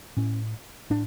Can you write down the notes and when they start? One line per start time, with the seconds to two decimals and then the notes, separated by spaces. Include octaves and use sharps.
0.17 A2 C#4
0.90 A2 D4